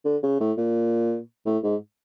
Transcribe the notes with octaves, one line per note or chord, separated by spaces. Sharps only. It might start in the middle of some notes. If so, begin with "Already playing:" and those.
D3
C#3
A2
A#2
A2
G#2